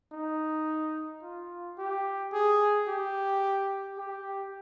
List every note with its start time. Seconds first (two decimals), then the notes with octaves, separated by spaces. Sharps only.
0.12 D#4
1.23 F4
1.78 G4
2.33 G#4
2.88 G4
3.98 G4